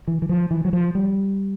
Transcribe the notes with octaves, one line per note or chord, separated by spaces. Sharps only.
E3
E3
F3
E3
F#3
F3
G3